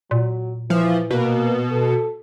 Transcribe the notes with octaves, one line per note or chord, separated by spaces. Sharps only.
A#2 F#3
E3 F3
B2 A#3
A4